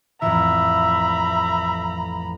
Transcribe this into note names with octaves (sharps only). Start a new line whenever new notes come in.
A1 F2 E5 A#5 B5